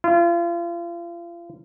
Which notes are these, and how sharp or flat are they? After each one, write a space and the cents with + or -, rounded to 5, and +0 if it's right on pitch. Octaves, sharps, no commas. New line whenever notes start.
F4 -35